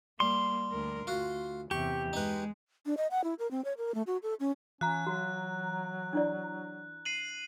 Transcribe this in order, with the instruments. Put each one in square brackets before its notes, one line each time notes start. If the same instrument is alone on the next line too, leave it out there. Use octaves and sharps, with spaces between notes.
[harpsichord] G3 [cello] A#3 [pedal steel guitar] C6
[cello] D2 A#4
[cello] D2 [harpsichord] F4 F#4
[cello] E2 C3 [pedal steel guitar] G4 [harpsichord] C#6
[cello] G#3 [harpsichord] D#4 B4
[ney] D4
D#5
F#5
E4
A#4
C4
C#5
A#4
A3
F#4
A4
C#4
[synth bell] E3 A#5 [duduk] C#4 [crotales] F#6
[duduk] F#3 [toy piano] F#4
[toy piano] D4 E4 D5
[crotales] C7 D#7 F#7